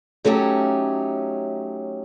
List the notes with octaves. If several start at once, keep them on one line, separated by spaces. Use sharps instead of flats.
F#3 A3 C#4 D#4 G4